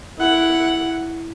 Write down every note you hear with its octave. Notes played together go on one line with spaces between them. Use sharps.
E4 F#5